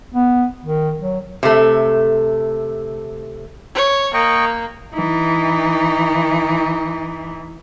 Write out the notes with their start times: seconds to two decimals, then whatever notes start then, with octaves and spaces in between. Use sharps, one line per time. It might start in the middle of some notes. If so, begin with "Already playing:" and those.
0.14 B3
0.64 D#3
1.00 F#3
1.43 C3 A3
3.75 C#5
4.14 A#3 D#5 G5 C#6
4.92 E3 D#4